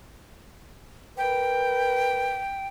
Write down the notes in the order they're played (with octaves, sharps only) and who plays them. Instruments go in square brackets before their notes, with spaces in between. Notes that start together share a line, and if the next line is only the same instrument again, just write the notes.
[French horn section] A#4 B4 [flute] G5